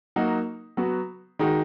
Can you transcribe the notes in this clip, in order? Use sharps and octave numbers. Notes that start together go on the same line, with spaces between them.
F#3 A#3 D#4 F#4
F#3 B3 F#4
D#3 G#3 D#4 F#4